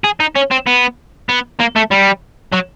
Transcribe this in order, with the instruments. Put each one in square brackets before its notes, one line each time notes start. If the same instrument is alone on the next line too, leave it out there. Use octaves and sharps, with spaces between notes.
[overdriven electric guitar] G#4
D#4
C#4
C4
B3
B3
A#3
A3
G3
F#3